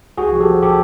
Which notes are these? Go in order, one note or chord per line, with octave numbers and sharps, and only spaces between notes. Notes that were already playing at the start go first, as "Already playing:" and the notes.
C2 F#4 G#4
F3
G4 A4
F3
A#2 G4 A4